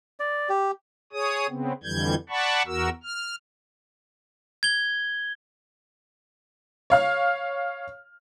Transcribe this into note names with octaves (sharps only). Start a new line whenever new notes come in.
D5
G4
G#4 C#5 D#6
C#3 B3 C4
F2 D3 E3 G3 G6 G#6
D5 F#5 A5 B5 C#6
E2 F#4 A#4 E6
F6
G#6 G7
C#5 F5 F6